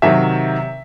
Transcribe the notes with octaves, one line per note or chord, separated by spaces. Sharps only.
C3 D#3 F#3 E5